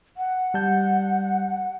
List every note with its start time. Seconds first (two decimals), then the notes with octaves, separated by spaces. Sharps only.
0.17 F#5
0.54 G3 A5 G6